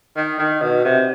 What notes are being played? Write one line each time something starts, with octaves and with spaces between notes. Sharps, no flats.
D#3
D#3
B2
C3